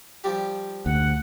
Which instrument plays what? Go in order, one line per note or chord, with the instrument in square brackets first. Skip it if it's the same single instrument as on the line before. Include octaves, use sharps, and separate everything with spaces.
[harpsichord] F3 G3 G4
[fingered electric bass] D2 [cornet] F#5